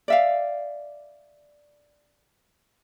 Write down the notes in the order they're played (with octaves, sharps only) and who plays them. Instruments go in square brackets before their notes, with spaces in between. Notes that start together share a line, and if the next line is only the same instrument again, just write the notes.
[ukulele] D5 E5 F5